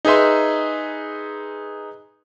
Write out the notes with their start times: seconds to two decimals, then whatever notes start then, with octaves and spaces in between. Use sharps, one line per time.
0.05 D#4 G#4 B4 E5 C6